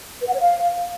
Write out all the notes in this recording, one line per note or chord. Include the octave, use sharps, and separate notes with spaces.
B4
F#5
C#5
F5